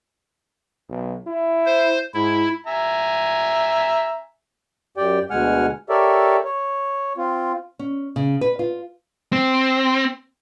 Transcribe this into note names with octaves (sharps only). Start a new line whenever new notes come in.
B1
E4
C5
G#2 E4
E5 G#5 A#5
F#2 G4 D5 G5
D2 B2 G#3 F#5 G#5 F6
G4 A4 A#4 C#5 D5 E5
C#5
C4 F4
C#4
C#3
B4
F4
C4